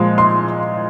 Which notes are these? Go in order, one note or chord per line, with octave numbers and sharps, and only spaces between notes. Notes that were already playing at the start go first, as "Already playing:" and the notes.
Already playing: A#2 F3 G#3
C6